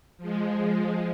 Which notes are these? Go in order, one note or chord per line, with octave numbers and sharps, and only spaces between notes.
F3 G#3